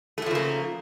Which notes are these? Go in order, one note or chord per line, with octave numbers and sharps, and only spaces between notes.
A2 C#3 F3 A3 A#3